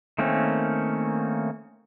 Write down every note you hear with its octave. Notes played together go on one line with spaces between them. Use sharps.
D#3 A3 A#3 C4 C#4